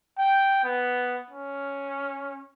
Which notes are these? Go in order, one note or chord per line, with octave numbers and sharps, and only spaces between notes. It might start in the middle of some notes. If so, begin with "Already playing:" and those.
G5
B3
C#4